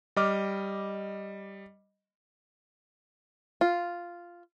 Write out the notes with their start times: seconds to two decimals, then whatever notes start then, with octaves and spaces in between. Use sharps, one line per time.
0.16 G3 D#5 D6 F6
3.61 F4